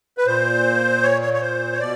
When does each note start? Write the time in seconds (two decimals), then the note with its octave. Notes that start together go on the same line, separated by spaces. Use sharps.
0.18 B4
0.26 A#2 C5
1.03 C#5
1.22 C#5
1.34 C#5
1.41 C5
1.73 C#5
1.80 B2 D5